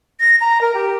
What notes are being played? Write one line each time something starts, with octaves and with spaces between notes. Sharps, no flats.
A#6
A#5
A#4
G4